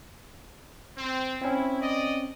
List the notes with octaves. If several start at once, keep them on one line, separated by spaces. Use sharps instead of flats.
C4
C4 C#4 E4
D5 D#5